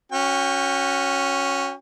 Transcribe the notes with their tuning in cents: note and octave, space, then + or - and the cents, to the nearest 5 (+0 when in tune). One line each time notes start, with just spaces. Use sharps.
C#4 +0 F#4 -15 G5 +35